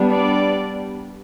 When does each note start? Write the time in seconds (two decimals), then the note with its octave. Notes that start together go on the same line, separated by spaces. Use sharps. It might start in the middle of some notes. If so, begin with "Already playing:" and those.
Already playing: G3 B3 D4
0.11 D5